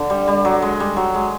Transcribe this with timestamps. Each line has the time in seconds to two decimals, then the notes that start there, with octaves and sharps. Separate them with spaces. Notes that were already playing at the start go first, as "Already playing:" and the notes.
Already playing: D3
0.10 G3
0.28 G3
0.45 F#3
0.62 G#3
0.80 G3
0.97 F#3
1.14 G#3